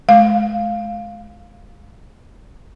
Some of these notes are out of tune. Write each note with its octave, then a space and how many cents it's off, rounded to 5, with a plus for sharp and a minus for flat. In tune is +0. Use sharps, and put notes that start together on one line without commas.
G#3 +30 F5 +0